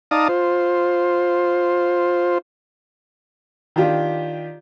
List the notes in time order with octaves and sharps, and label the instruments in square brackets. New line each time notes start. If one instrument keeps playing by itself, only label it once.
[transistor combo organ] D#4 D5 F5 A5 A#5 D#6
F4 C5
[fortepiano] D#3 D4 F4 G4